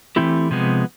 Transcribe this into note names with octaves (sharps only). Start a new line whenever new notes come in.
E3 A3 C4 E4 G4
C3 F3 G#3 B3